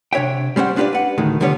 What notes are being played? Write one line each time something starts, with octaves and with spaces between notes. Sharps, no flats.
C3 D4 C#5 E5 G5
G3 G#3 C#4 C5 F#5
C#4 D4 F4 G4 B4 D5
B4 F#5
D2 A2 D#3 G#3
C2 D3 F3 G3 B3 C#5